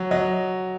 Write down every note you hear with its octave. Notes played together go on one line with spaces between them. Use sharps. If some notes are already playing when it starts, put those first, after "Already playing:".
Already playing: F#3
F#3 D#5